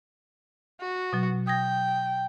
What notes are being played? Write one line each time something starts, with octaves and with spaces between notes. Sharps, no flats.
F#4
B2 F#3
G5 D#6 G#6 A#6